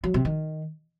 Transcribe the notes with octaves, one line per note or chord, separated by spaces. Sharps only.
F#3
C3
D#3